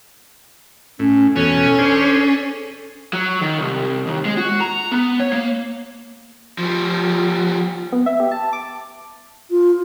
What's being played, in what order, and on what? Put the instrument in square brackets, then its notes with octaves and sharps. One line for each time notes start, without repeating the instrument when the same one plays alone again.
[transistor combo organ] A2 [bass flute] C#4
[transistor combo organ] E2 B2 [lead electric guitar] C#4 [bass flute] A4
[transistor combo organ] D4 G#4 C5
[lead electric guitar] F#3
D#3
C2
D#2
G#3
F#4
A#5
B3
C#5
A#3
F3 G3
[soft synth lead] B3
E5
G4
A5
D6
[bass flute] F4